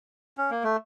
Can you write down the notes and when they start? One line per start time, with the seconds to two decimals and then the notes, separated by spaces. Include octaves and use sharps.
0.37 C#4
0.50 A#3
0.64 A3